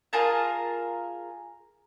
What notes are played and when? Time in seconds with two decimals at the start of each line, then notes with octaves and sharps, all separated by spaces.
0.13 F4 G#4 A#4 A5